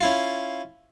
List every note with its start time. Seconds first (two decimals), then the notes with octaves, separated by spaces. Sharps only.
0.01 C#4 E4 F4